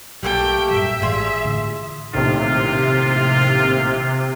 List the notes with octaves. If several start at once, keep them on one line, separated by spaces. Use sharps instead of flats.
B1 F#3 A3 A#3 G4 G5
G2 A#2 F#3 E5
A1 G#3 F4 G#4
A2 D3 E3
A#1 A2 C3 D#3 F4